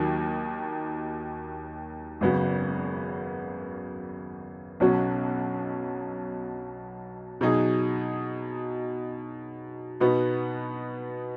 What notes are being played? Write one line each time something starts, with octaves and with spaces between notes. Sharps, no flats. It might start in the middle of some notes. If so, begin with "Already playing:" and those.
Already playing: D#2 D#3 F#3 D#4
G#1 F#2 C#3 B3 F#4
B1 B2 F#3 C#4 F#4
B2 F#3 D#4 G#4
B2 B3 D#4 F#4